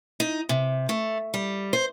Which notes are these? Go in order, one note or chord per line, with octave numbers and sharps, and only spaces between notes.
D#4
C3
A3
G3
C5